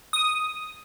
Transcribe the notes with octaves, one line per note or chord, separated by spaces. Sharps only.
D#6